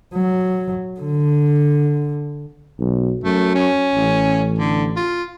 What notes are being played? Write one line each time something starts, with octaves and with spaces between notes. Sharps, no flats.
F#3
D3
B1
F#2 A3
C#4
A1
D3
F4